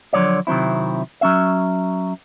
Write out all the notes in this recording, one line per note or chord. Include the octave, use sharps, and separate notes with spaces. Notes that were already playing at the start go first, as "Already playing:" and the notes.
D3 F3 F#3 D#4 C#5 D5
C3 D#3 F#3 C4 E4
F#3 C#4 E5